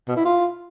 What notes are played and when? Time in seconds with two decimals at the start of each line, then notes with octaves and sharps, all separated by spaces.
0.08 B2
0.17 E4
0.25 F4